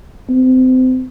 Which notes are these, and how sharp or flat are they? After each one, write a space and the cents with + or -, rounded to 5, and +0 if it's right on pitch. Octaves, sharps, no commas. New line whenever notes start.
C4 -30